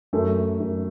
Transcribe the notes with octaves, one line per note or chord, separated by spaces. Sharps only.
F#2 A3
F#2